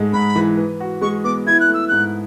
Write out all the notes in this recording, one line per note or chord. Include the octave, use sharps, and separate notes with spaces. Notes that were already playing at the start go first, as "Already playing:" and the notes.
Already playing: G#2 G#3 A3
G#2 B5
E3
B4
F#4
G#3 C#6
B3 D6
E4 G#6
F#6
A3
E6
G#2 F#6